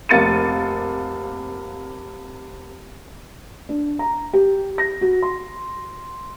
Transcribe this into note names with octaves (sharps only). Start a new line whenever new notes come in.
F1 C3 A#3 A6 C#7 D#7
D4
A#5
G4
A#6
F#4
C6